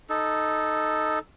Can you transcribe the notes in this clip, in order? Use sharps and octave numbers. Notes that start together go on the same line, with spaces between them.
D#4 A4